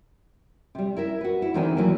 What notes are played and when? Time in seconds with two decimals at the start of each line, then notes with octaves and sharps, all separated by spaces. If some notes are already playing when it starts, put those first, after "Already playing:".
0.75 C3 G3
0.97 E4 A#4 E5
1.21 F#4 B4
1.42 E4
1.54 E2 D3 D#3 C4 E4 G#4
1.77 E3 F#3 A3 A#3